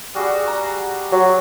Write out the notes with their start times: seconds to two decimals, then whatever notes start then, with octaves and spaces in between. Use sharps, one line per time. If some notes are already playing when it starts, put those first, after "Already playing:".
0.15 G3 F#4 G#4
0.47 A#5
1.12 F#3